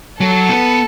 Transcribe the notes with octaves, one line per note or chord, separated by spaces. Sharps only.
F#3 A4
B3